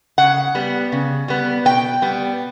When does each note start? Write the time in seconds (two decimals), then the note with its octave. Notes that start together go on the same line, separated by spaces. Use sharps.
0.18 C#3 F#5
0.55 G3 B3
0.92 C#3
1.28 G3 B3
1.65 B2 G5
2.02 G3 B3